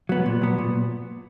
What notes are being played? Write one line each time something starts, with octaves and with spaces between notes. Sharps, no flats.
F#3 B3
A#2
F#3 B3
A#2